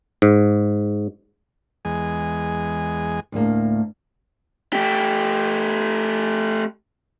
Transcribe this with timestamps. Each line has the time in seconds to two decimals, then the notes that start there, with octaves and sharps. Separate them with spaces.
0.22 G#2
1.85 E2 G#3 G#5
3.32 D2 A2 A#3
4.73 A3 G4